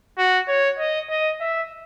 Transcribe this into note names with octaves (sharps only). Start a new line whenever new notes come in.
F#4
C#5
D#5
D#5
E5